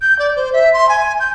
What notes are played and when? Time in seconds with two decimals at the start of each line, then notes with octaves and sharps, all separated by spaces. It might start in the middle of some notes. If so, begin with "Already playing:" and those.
0.01 G6
0.19 D5
0.36 C5
0.53 E5
0.73 C6
0.89 G#5
1.20 G6